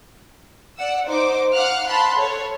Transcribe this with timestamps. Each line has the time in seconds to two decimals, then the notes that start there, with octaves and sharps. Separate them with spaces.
0.78 D5 F#5 E6
1.07 D#4 C5 D6
1.53 F5 F#5 F6 F#6
1.87 A5 B5 C6 F#6
2.18 A4 C#5